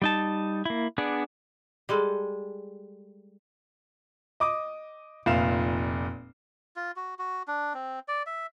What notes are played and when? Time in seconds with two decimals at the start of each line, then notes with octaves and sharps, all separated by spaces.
0.02 G3 D#4 A5
0.65 A#3 E4
0.98 B3 D4 G#4 D5
1.89 G3 G#3 A4
4.40 D#5 D6 D#6
5.26 F1 A#2 F5 E7
6.76 F4
6.96 F#4
7.19 F#4
7.48 D4
7.74 C4
8.08 D5
8.26 E5